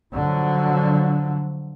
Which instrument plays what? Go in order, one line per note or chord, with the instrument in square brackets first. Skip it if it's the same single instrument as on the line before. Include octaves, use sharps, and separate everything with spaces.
[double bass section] D3 F3 F#3